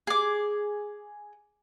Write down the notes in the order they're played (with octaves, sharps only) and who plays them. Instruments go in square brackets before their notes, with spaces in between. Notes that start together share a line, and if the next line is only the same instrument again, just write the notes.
[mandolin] G#4 D6